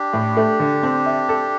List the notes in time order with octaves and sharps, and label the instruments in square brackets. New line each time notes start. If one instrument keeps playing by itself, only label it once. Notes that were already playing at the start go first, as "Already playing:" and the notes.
Already playing: [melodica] D4 G4
[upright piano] A2
A3
D3
C4
E5
A4